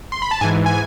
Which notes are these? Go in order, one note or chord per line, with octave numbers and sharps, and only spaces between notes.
C6
B5
A5
G#2 E3 G#5
G#5